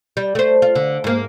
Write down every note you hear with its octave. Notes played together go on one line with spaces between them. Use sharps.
G3
A3 C5
F4
D3
G#2 A#3